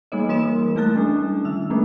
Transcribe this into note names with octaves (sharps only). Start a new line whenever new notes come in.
G3 A#3 D#4 C#5 D#5
E3 A#3 A#4 C6 D#6 E7
G#3 A3 E4 A5 F#6 A6
G3 C#4 D4
D#3 E5 E6
G3 A3 A#3 C#4 D4